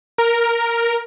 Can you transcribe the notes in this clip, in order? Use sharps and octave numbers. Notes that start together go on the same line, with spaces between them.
A#4